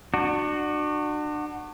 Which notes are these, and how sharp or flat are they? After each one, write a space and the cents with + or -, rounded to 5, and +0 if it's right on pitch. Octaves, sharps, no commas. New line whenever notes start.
D4 +35 F#4 +0